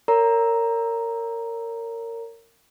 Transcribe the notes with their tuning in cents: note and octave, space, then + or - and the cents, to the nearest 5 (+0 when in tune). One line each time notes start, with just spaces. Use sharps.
A#4 -25 C#5 +20 A#5 +0